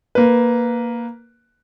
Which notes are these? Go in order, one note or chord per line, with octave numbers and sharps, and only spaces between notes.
A#3 B4